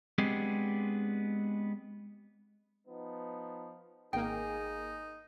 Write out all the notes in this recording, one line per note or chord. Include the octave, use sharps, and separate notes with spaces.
G#3 B3 C4 D4 G4 G#4
F3 B3 D#4
G#1 A#3 D#4 G#4 G5